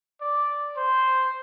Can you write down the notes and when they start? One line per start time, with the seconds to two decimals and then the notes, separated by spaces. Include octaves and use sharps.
0.21 D5
0.76 C5